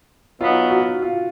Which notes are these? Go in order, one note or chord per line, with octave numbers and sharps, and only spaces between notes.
B2 F#3 B3 D#4 F4
F#4
F4